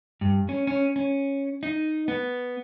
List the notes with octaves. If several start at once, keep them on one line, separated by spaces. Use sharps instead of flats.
G2
C#4
C#4
C#4
D#4
B3